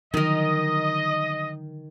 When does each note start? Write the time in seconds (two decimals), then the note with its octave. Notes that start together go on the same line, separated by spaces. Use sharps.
0.14 D3 D#3 F3 F#3 A#4 D#5